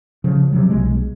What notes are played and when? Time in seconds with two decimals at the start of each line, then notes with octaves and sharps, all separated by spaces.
0.24 C#3 F3
0.52 C3 D#3 F3 F#3
0.70 B1 G#3